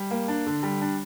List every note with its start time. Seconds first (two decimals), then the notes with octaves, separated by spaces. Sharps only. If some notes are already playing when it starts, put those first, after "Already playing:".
Already playing: G3
0.11 A#3
0.28 D4
0.47 D3
0.63 G3
0.81 D4